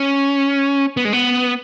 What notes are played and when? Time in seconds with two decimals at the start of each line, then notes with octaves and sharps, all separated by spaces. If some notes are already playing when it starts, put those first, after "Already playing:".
Already playing: C#4
0.97 B3
1.05 G#3
1.13 B3